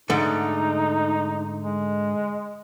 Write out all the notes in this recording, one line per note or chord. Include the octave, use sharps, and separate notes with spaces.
G#2 D3 A3 D#4
G#3